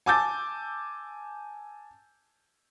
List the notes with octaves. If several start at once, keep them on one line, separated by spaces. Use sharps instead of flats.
G#5 A5 D6 E6 G6 A6